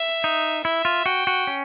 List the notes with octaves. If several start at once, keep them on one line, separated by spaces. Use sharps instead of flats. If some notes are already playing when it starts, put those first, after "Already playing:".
Already playing: E5
D#4
E4 E5
F4
F#4 G5
F#4
C#4